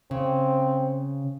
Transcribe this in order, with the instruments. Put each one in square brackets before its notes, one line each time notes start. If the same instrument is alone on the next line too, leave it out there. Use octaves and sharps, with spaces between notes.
[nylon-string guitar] C#3 [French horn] C4